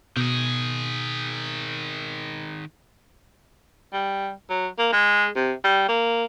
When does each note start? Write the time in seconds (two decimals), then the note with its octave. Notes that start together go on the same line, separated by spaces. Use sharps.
0.17 B2 D#3 G#4
3.93 G3
4.50 F#3
4.79 A#3
4.92 G#3
5.36 C3
5.64 G3
5.88 A#3